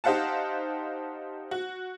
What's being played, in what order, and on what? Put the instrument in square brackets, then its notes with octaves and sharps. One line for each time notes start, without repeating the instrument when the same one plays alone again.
[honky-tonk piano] D#4 G4 C5 F5 F#5 A5
F#4